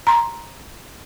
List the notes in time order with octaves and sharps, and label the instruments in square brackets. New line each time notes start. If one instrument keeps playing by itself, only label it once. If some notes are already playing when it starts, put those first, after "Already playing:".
[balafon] A#5 C6